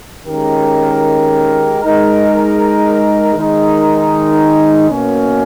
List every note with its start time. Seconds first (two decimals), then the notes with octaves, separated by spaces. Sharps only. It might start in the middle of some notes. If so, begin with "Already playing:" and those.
0.25 D#3 G#3 C#4 G4 A#4
1.79 G#3 D#4 A#4
3.35 D#3 G#3 D#4 A#4
4.89 B2 A#3 C#4